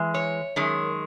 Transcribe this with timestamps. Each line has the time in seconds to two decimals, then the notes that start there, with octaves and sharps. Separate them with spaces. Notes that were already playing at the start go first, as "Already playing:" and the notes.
Already playing: E3 G#3
0.14 C#5
0.56 F#2 D#3 G#3